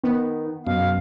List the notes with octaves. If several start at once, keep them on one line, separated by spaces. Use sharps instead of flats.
D#3 B3
F#2 B2 F5